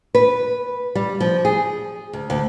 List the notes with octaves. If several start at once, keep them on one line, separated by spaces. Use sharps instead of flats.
B4
G3
F3
G#4
D2
D2